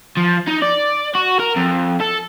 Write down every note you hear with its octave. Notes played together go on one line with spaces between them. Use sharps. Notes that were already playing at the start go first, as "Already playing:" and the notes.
F3
D#4
D5
F#4
A#4
F2
A4